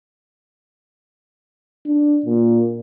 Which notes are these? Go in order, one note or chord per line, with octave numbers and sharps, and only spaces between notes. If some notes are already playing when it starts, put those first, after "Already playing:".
D4
A#2